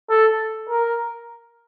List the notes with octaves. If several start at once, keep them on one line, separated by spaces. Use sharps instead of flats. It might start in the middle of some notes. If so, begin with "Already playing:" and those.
A4
A#4